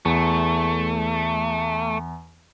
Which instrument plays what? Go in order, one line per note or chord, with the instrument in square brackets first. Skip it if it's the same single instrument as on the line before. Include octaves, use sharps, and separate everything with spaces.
[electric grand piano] E2 [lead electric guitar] A3